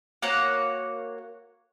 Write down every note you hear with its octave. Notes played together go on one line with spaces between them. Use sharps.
A#3 F#4 C#5 F#5